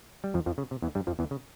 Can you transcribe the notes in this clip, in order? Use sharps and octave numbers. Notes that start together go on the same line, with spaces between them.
G3
F2 F3
F2 F3
C#3
C3
E2 E3
G2 G3
F2 F3
E2 E3
C#3